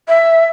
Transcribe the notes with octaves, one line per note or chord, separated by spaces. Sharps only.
E5